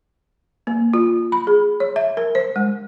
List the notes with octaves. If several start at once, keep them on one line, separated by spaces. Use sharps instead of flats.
A#3
F4
B5
G#4
C#5
E5
A#4
C5
G#3